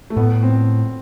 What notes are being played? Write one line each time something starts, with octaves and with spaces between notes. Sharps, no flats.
A3
A2 B3
C4